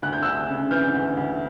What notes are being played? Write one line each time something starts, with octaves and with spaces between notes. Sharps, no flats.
D2 F#6
G6
D2 E6 F#6
C#3
E3 F6 G6
D2
D2